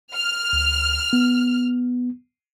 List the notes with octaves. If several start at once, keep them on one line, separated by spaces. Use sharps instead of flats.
F6
D2
B3